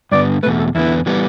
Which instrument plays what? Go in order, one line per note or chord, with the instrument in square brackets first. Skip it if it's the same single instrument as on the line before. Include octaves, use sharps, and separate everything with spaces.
[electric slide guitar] G2 D3 B3 [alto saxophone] D5
[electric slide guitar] E2 B2 A3 [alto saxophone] B4
[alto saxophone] A4
[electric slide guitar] E2 D3 B3 [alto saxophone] E4
[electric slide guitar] E3 G3 B3